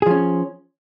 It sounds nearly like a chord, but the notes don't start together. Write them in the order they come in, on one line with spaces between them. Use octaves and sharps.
G#4 F3 C#4